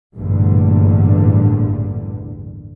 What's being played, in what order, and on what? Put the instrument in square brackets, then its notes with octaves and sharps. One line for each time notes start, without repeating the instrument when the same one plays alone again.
[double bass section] A1 E2 G2 A#2 D3